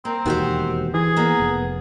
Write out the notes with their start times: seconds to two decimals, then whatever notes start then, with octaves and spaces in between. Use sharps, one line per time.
0.05 A#3 C4
0.26 E1 D#2 D#3 F#4 G4 C5
0.94 E3 G#4
1.17 A#3 B3
1.40 F1